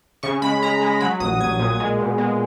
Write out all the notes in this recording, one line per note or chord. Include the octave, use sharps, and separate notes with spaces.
C#3 C#6
G#3 B5
G#3 A#5
G#3
F#3 B5
A#1 D#6
A#1 G#6
A#2
G#3
B2
G#3